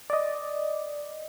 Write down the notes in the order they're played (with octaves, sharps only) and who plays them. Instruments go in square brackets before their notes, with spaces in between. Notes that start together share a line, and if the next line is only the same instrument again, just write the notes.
[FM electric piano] D5 D#5